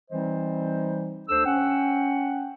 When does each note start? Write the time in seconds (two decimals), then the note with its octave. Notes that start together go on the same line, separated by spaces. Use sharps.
0.11 E3 G3 C4 D#4 C5 D#5
1.29 D2 D4 A4 C5 E6
1.46 C#4 F#5 G5